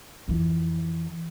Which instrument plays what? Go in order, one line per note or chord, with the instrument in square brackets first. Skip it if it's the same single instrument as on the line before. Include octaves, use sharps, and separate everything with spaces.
[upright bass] F2 E3